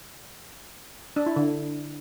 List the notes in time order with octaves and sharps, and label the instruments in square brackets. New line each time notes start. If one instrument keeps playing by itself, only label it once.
[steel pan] D4
E4
D3